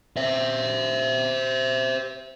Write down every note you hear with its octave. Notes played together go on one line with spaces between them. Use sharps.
C5 E5